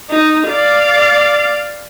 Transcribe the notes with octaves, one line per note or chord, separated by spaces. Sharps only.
D#4
D5 F5